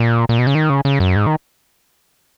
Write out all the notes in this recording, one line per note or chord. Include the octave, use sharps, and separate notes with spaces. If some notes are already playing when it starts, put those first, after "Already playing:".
Already playing: A#2
A#2
B2
C#3
D#3
C#3
C#3
F#2
G#2
D#3